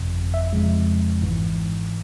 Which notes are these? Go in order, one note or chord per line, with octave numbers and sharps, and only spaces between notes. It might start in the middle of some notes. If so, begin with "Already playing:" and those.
Already playing: G1 F2 C3
E5
F2 C#3 F3 G#3
G#1 G#2 E3